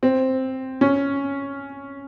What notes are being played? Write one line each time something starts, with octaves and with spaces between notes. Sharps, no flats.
C4
C#4